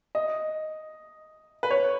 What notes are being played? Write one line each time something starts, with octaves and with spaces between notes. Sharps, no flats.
D#5
B4
C#5